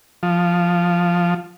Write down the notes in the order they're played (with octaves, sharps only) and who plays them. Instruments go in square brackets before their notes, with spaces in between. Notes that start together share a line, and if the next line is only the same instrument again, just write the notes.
[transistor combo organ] F3